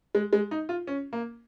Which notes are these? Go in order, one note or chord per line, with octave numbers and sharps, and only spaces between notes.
G#3
G#3
D#4
F4
C#4
A#3